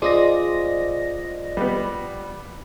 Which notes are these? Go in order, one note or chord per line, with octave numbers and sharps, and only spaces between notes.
F4 G#4 C5 D5 D#5 A#6
G3 B3